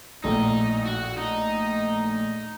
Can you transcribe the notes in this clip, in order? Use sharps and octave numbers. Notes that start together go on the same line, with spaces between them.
A#1 A2 A3 D#4
F#4
D#4